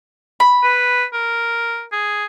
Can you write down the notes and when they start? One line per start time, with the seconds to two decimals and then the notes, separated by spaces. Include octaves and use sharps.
0.40 B5
0.63 B4
1.13 A#4
1.92 G#4